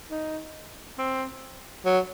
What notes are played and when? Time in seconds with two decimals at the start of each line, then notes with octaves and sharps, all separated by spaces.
0.11 D#4
0.98 C4
1.85 F#3